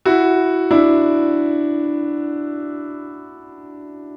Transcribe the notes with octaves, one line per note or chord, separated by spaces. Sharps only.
E4 F#4
D4 E4